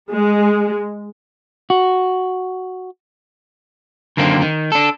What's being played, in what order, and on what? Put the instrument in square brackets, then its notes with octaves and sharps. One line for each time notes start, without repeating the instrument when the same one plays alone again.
[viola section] G#3
[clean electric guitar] F#4
F#2 D3 D#3 A#3 C4
D#3
D4 A4